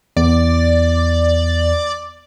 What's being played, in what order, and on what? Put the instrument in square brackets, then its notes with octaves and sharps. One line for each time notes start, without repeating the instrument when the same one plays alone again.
[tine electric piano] E2 [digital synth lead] D5